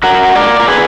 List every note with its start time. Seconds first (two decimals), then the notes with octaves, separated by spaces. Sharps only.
0.03 D3 F#4 A#4
0.35 G#3 D4 A#4 D5
0.60 A#4
0.68 D3 G#4 B4